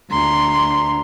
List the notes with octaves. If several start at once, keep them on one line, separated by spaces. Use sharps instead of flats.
D2 A#5 C6